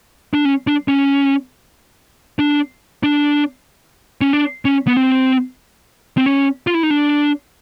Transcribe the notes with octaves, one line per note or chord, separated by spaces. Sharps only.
D4
C#4
D4
C#4
D4
D4
C#4
D4
C#4
B3
C4
C4
C#4
F4
E4
D#4
D4